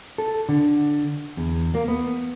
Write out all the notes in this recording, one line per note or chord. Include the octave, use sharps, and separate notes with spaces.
A4
D3
E2
A#3
B3